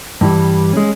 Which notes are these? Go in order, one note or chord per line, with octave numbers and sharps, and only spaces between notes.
G2 E3 G3
G#3 C#4